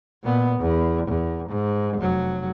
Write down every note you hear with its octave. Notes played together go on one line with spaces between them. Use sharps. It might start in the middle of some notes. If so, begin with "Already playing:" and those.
A#2 B3
E2
E2
G#2
F1 F#3